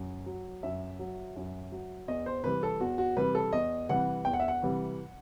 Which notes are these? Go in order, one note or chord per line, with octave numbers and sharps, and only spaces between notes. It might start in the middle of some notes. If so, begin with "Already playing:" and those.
Already playing: F#2
F#3
F#2 E5
F#3
F#2
F#3
E2 D#5
C5
C3 E3 G3 B4
A4
E2 F#4
F#4
C3 E3 G3 B4
A4
E2 D#5
C3 E3 G3 F#5
E2 G5
F#5
E5
F#5
C3 E3 G3